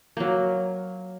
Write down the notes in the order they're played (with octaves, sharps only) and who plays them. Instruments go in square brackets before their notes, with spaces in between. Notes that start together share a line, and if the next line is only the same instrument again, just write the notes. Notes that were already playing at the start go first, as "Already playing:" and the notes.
[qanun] F#3 A#3